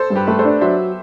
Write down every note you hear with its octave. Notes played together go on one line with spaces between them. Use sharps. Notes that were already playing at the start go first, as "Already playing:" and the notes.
Already playing: A4 C5
G2
G4 B4
A3 B4
A4 C5
D4
F#3 C5 E5